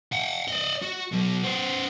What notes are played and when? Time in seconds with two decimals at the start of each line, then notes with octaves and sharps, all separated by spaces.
0.13 F#5 G5
0.48 D5 D#5
0.83 F#4
1.12 B2 F#3
1.44 B3 C5